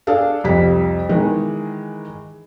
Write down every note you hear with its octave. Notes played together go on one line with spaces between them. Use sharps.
D4 G#4 A4 F5
C2 F2 G3 B6
D#3 E3 G#3